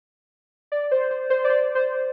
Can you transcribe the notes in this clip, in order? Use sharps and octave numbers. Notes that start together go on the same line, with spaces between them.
D5
C5
C5
C5
D5
C5
C5